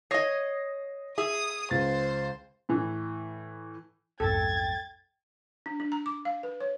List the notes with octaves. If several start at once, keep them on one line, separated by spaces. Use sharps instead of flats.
C#5 D#5 D#6 A#6 C7
G#4 E5 D#6
C#2 C5 A6
A2 E3
B1 F2 G#2 A4 G5 G#6 A6
D4
D4
A#5
D6
F5
B4
C#5